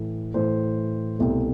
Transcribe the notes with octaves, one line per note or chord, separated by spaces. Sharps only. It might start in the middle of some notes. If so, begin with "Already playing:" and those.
Already playing: A2 E3 A3
A2 E3 A3 C5
C2 B2 A3